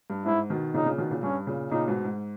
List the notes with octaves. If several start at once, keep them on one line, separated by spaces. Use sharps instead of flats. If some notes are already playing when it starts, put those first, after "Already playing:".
G2
G#2 E4
B2 D#3
A#2 C#3 D#4
A#2 C#3
B2 D#3
A#2 C#3
G2 C#4
A#2 C#3
A#2 C#3 D#4
G#2 B2
G#2